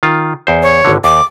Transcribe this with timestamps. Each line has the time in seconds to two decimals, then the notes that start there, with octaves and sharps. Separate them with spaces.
0.03 D#3 F4
0.47 E2 C5
0.63 C#5
0.85 G#1 D3
1.04 D#2 D6